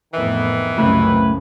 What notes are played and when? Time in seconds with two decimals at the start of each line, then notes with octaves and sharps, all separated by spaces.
0.14 F2 A2 D#3 E3 B3
0.78 C2 F#2 A2 C#3 B4